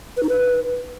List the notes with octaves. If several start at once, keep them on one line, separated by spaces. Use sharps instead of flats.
B4
D#4
B4